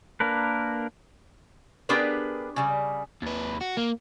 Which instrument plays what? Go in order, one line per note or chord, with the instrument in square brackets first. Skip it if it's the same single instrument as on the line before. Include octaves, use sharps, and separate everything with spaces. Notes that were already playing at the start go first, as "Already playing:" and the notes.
[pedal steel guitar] A#3 D4 A#4 B4
[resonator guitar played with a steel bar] B3 D4 G4 G#4 A#4 B4
C#3 G3
[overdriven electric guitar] D#2 B4
F#4
A#3